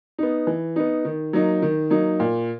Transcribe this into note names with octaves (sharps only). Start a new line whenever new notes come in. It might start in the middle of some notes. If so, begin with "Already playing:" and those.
B3 D#4
E3
B3 D#4
D#3
F#3 A#3 D#4
D#3
F#3 A#3 D#4
A#2